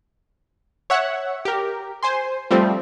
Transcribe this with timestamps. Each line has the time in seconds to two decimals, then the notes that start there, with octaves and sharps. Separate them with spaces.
0.90 C#5 E5 F#5
1.45 G4 A#4
2.03 C5 G#5 C6
2.51 F3 G3 A3 C4